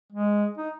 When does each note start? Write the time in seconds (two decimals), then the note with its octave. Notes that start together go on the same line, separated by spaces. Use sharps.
0.12 G#3
0.58 D#4